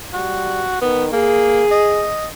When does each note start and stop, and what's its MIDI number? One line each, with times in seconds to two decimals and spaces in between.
0.13 0.65 55
0.13 0.80 66
0.81 1.08 51
0.81 1.05 59
1.12 1.63 58
1.12 2.11 68
1.71 2.26 75